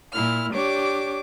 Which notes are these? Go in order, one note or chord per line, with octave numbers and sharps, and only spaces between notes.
A#2 E4 F6
D4 G4 C#5 D6